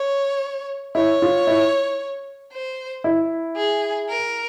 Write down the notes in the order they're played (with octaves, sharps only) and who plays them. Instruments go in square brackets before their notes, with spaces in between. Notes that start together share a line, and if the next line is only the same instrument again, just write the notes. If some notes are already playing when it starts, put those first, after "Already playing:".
Already playing: [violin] C#5
[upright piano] E4 [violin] C#5
[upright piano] F4
E4
[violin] C5
[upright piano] E4
[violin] G#4
A#4